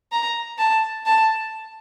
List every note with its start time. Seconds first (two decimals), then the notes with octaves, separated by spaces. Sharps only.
0.12 A#5
0.58 A5
1.06 A5